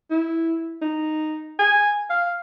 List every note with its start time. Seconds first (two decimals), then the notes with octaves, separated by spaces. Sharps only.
0.10 E4
0.82 D#4
1.59 G#5
2.10 F5